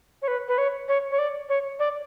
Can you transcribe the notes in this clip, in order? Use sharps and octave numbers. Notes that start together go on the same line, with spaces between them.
C#5
B4
B4
C#5
C#5
C#5
D5
C#5
D5